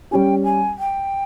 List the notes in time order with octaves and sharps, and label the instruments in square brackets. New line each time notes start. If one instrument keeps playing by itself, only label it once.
[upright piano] G3 C#4 G4 [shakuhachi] G5 G#5
[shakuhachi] G#5
G5